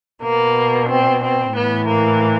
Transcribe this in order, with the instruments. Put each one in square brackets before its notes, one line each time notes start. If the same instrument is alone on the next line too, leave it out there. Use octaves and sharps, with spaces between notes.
[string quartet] B2 A#3
C4
C4
A2 E3 B3
A#3